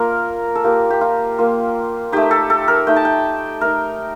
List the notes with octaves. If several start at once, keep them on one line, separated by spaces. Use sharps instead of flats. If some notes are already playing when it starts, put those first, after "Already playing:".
Already playing: A#3 F4 A#4
A4
A#3 F4 G4
G4
F4
A#3 F4
A3 D#4 G4
A4
A4
A#4
A3 D#4 G5
A5
G5
A3 D#4 A#4